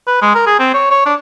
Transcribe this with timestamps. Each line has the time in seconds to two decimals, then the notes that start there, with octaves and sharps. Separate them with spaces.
0.07 B4
0.22 G#3
0.35 A#4
0.47 G#4
0.59 C4
0.74 C#5
0.91 C#5
1.06 D4